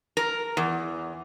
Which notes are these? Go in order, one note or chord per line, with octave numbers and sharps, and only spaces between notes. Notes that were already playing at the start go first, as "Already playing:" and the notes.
A#4
E2